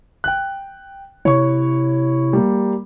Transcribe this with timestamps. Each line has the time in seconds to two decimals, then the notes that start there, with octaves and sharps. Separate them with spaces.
0.24 G5 F#6
1.25 C3 E4 C#5 C#6
2.33 G3 A#3